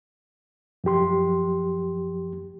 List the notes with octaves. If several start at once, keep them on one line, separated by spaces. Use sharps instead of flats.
F#2 F3 G4 C6